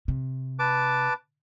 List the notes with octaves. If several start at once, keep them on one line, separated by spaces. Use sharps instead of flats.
C3
B4 A5 D6